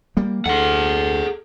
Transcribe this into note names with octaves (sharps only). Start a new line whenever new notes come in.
G3 A#3
D2 G#4 A4 F#5